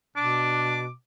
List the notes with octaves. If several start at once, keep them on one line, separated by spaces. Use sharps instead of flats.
B2 D4 D6